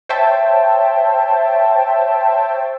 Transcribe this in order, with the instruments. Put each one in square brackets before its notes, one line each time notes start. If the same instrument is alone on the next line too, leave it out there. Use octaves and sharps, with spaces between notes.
[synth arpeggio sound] C5 C#5 E5 G5 A5